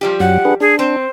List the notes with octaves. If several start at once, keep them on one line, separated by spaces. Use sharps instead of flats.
F3 G3 G4
F#2 F#3 F#5
D4 G#4 B4
D4 G#4
C4 C5